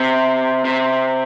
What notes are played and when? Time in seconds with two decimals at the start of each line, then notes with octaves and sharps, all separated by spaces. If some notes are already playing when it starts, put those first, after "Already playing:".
Already playing: C3
0.65 C3